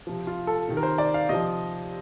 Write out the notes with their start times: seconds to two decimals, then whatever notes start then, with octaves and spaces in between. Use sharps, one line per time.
0.07 C3 F3
0.27 F4
0.47 A4
0.68 C3 D#3
0.77 A#4
0.83 C5
0.98 D5
1.14 F5
1.29 C3 F3 D#5